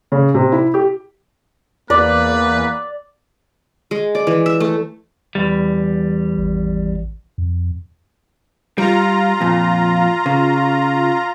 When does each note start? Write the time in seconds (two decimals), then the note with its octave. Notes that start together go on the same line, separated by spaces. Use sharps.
0.12 C#3
0.34 C3
0.52 E4
0.74 G4
1.90 E2 A#3 B4 D5
3.91 G#3
4.15 D5
4.27 E3
4.46 E5
4.60 A3
5.35 E2 G3
6.37 G#1
7.38 F2
8.78 G3 F4 A#5
9.41 F2 A#2
10.26 C#3